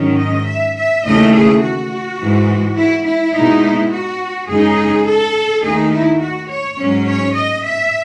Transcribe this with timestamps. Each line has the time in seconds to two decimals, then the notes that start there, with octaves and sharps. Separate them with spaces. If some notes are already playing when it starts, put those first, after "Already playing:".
Already playing: G#2 D#3 F#3 C#4
0.20 D#5
0.48 E5
0.77 E5
1.06 D#2 C#3 E3 A3 D#5
1.34 G#4
1.63 F#4
2.20 G#2 E3 G#3
2.77 E4
3.05 E4
3.35 B2 G#3 D#4
3.63 E4
3.92 F#4
4.49 F#2 C#3 G#3 D#4 G#4
5.07 A4
5.63 D#2 D#3 A3 D#4 G#4
5.92 E4
6.21 F#4
6.49 C#5
6.78 G#2 F#3 C#4
7.07 C#5
7.35 D#5
7.65 E5